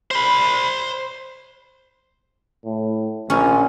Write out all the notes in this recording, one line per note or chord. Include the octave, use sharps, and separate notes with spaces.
C5 B5
A2
A#1 F3 C#4